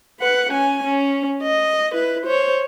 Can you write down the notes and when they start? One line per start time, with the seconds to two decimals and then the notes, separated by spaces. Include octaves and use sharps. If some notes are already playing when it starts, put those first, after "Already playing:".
0.20 B4 F#5
0.52 C#4 G#5
0.84 C#4
1.43 D#5
1.93 E4 B4
2.26 C5 C#5